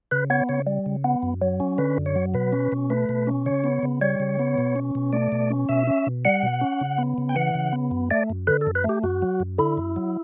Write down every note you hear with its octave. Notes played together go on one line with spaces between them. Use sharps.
C#3 B4
B3 C#5
C#3 C#5
G3
C#3
B3
F#2
F#3
C#4
D3 B4
F#2
C#5
F#3
B2 B4
C#4
B2
A3 B4
B2
C#4
C#3 C#5
B3
C#3
G3 C#5
C#3
B3
B2
C#4
B2
A3 D5
B2
C#4
B2 E5
C#4
B2
G3 F#5
B2
C#4
C#3
B3
C#3
G5
E3 F#5
C#3
B3
F#2
A3 D5
F#2
D3 B4
A4
F#2
B4
A3
G4
F#2 F#4
F#3
F#2
D3 E4
F#2
F#3